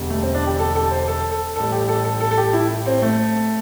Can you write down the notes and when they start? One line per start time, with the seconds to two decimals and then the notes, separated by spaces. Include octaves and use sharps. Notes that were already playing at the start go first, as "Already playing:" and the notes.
Already playing: E1 E2 D3 G3
0.10 A3
0.22 C4
0.34 D4
0.47 G4
0.59 A4
0.75 A4
0.91 C5
1.08 A4
1.31 A4
1.56 A1 A2 G3 A4
1.72 G4
1.88 A4
2.04 A4
2.21 A4
2.31 A4
2.37 G4
2.53 E4
2.86 C4
3.02 A3